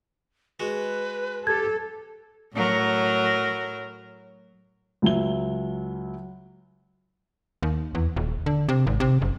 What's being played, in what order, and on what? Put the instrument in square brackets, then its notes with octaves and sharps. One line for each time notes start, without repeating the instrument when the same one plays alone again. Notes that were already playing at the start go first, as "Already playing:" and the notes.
[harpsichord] G#3 F#4 [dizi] B4
[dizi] G4 [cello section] A4 [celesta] G#6
[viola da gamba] A2 F#3 A#4
[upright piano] C#2 F#3 E5 G7
[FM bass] D#2
E2
D#1
D3
C3
G#1
C3
F#1